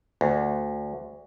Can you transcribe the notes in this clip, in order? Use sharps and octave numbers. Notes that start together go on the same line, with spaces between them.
D2